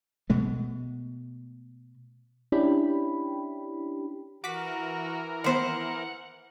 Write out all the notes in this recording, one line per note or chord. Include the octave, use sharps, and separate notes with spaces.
B2 G#3 A3
C#4 D4 E4 G4 G5 B5
E3 F#4 A#4 D6 B6
D#3 B3 E4 C5 F#5